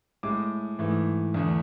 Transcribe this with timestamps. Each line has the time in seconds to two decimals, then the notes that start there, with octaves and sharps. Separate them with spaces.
0.23 A2 G#3 D6
0.79 G#2 E3 A3
1.34 E2 D3 A3